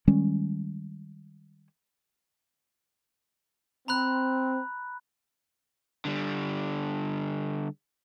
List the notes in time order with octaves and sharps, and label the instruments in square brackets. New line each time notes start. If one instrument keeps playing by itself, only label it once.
[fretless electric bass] D#3 G3 G#3 C#4
[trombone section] C4 [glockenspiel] A#5 B5 F#6
[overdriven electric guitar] D3 G3